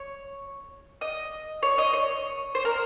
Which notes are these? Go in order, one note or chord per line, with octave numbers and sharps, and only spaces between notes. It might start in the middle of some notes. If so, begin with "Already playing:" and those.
Already playing: C#5
D#5
C#5
D#5
C#5
C5
A#4